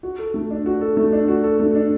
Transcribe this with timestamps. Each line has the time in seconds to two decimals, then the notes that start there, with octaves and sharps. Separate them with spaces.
0.03 F#4
0.19 A4
0.34 A3
0.50 D4
0.66 F#4
0.81 A4
0.97 A3
1.13 D4
1.28 F#4
1.44 A4
1.60 A3
1.75 D4